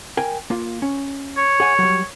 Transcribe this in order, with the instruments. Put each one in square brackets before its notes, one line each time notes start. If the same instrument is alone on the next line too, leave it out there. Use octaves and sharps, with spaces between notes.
[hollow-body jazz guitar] A#4 G5 G#5
A#3 F4
C#4
[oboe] C#5
[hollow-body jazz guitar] G#4 F#5 G#5
F#3 G3